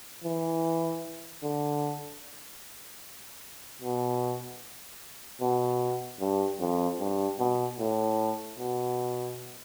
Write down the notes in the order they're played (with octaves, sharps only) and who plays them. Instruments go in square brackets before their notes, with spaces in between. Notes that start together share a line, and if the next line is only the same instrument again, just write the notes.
[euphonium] E3
D3
B2
B2
G2
F2
G2
B2
A2
B2